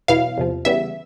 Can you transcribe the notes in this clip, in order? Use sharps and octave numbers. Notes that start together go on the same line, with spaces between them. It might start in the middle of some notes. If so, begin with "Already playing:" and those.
E2 B2 F#3 B3 E4 F5
E2 C3 F3
C#3 E3 G3 B3 E5